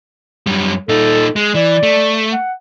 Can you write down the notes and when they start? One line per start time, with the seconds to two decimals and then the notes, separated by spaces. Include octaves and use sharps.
0.47 F#2 G3
0.89 A#2 D#4 A4
1.36 G#3
1.55 E3 D5
1.83 A3
2.33 F#5